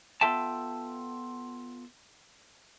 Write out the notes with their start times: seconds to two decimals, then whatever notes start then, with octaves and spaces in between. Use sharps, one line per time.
0.21 B3 F4 A4 E5 G5 A5